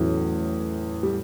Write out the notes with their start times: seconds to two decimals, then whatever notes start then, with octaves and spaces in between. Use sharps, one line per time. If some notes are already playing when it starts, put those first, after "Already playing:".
Already playing: E2 A2 E3 F#3 C#4 E4
1.03 G3